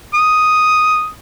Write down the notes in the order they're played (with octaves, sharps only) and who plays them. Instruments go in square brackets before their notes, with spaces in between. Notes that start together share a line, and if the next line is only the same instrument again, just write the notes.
[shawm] D#6